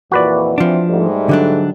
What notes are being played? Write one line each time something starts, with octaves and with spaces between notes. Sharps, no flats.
F2 A#2 E3 F#4 B4 D5
E3 F3 C4 D4
G#2 G3 A3
D3 F#3 D4